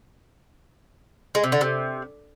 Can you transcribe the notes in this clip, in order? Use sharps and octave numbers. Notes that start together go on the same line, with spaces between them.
G#3
C3
D3
C3